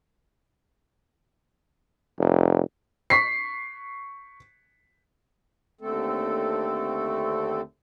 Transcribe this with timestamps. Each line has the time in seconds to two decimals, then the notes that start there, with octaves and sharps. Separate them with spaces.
2.19 F1
3.10 C#6 B6 C7
5.81 D#2 D3 A3 C4 A4